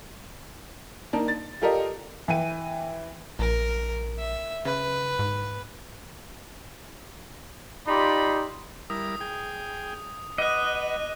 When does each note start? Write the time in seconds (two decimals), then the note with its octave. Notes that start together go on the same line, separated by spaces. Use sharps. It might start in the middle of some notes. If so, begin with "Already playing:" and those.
1.13 A#3 D4 D#4 D5 A5
1.28 A6
1.62 F4 G4 A4 A#4 D5 D#5
2.28 E3 G5 D#7
3.39 A#1 A#4
4.18 E5
4.65 C#3 B4
5.19 G#2
7.87 D#4 F4 G4 D5 B5 C6
8.90 G3 E4 A#4 D#6
9.21 G#4 G5
10.38 B4 D#5 F#5 D6 F#6